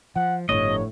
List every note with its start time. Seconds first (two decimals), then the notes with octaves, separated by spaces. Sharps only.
0.16 F3 F#5
0.49 G1 A2 F3 C#5 D#5